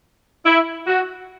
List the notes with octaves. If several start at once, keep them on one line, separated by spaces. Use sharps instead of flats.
E4
F#4